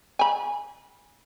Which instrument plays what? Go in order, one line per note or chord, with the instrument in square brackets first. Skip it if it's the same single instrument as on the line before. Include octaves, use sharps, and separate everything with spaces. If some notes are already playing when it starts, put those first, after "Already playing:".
[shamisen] G#5 B5